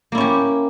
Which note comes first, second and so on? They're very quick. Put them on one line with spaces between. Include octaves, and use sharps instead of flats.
A#3 E4 C#4 G4